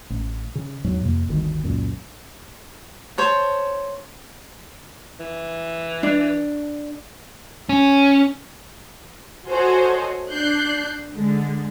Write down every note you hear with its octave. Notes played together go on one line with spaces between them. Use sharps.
A1
C#3
E2 G#2 F#3
F2 C3 A#3
G1 D2 D#3
C#2 F#2 A#2
C5 C#5 A5
E3
D4
C#4
F#4 A4 C5 C#5 D#5 G#5
D4 F#6 G6 C7
D3 G#3